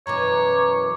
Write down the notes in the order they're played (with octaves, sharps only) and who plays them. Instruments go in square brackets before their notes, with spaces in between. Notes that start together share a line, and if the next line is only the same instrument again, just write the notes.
[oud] F#2 B2 E3 [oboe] C#5 [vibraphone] A#5 D6